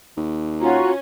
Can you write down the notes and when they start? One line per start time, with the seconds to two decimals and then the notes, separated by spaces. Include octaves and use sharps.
0.17 D#2
0.61 C#4 F4 F#4 A#5